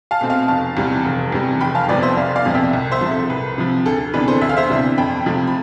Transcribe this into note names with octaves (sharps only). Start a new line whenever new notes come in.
F5 A5
B2 A3 C4
F5 A5
F1 F5 A5
E2 C3 G3
F1
E2 C3 G3
F1 G5 B5
F5 A5
F2 C3 F3 B3 B4 D5
C5 E5
F1 D5 F5
D5 F5
F2 C3 F3 B3
E5 G5
C2
C5 E5
C3 F3
A4
C2 B4
C3 F3
D2 A4
C3 E3 B3 D4 B4
A4 C5
D2 E5
F5
C5 E5
C3 E3 B3 D4
F2 G5 B5
C3 F3 A3
B5